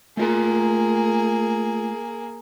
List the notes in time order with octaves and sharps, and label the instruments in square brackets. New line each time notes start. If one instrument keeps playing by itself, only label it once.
[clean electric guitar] A3 F4 A#5 [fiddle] A#3 G#4